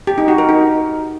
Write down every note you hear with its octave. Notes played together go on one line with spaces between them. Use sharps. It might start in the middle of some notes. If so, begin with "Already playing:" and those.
G4
D#4
F#4
A#4
D#4